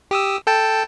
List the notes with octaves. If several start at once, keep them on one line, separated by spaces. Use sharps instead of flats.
G4 D#6 E6
A4 G5 A5